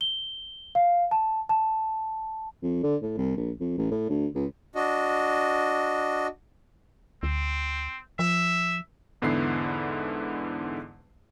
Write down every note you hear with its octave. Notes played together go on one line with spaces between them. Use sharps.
G7
F5
A5
A5
F2
D3
A2
C2
A#1
F2
A1
A2
D2
C#2
D4 F#4 D#5
D2 C4
F3 E5
E2 G#2 D3 B3 E4 C7